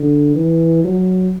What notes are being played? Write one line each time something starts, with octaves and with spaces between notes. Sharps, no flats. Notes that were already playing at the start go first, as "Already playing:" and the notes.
Already playing: D3
E3
F#3